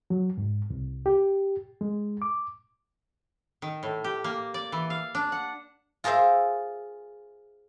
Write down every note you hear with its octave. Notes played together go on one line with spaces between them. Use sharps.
F#3
G#2
C2
G4
G#3
D6
D#3
A2
G4
A#3
D5
E3
F5
D4
F#5
F4 G#4 A#4 C5 E5